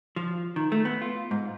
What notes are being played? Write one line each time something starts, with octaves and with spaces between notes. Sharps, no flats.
F3
D#3
A3
B3
F4
G#2